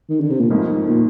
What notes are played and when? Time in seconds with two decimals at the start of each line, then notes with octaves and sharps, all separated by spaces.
0.09 D#3
0.20 D3
0.30 C3
0.40 A#2
0.50 G1 F2 G#2 D#3 A#3 F4
0.89 A#2